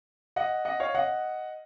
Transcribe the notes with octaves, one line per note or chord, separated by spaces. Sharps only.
D#5 F#5
D#5 F#5
C#5 F5
D#5 F#5